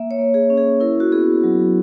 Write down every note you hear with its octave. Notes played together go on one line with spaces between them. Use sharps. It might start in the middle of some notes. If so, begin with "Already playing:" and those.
Already playing: A#3 E5
C#5
A#3
G#4
C#4
G#4
E4 A#4
F#4
B3 G#4
F#3